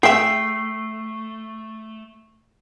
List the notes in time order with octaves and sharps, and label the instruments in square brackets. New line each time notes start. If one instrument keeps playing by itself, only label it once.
[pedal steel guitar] A3 [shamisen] G#4 E5 [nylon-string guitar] G5 [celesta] C7